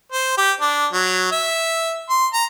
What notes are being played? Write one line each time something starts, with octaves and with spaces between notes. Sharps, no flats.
C5
G4
D4
F#3
E5
C6
A#5